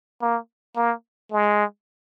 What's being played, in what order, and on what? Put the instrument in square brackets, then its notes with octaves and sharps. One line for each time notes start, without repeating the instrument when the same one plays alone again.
[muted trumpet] A#3
A#3
G#3